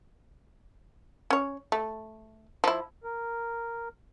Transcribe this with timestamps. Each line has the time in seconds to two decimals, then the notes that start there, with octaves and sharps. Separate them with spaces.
1.30 C#4 C#5
1.72 A3
2.64 F3 E4
3.04 A#4